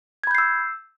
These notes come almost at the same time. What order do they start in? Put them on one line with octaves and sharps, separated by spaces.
G#6 B5 G6 C7 E6